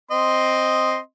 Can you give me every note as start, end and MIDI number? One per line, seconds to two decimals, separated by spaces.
0.11 0.98 60
0.11 0.98 75
0.11 0.98 84